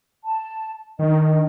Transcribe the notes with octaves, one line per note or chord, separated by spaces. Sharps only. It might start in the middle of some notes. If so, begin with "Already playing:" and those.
A5
D#3 D4 D#5